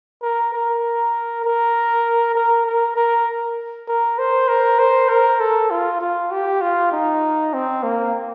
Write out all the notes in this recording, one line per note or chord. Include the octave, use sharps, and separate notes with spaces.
A#4
A#4
A#4
A#4
A#4
A#4
A#4
C5
A#4
C5
A#4
A4
F4
F4
G4
F4
D#4
C4
A#3